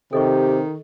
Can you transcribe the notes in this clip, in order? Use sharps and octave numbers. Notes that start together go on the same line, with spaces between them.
C3 D#3 G4 A4 D#5 C#6